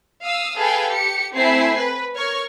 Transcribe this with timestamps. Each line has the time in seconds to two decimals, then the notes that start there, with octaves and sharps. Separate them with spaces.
0.24 F5 D#6 E6
0.57 G#4 A4 B4 F5 G5 G#5
0.90 G4 C#7
1.34 A3 C4 E4 G#5 C7
1.77 B4
2.16 A#4 C#5 C#6 F6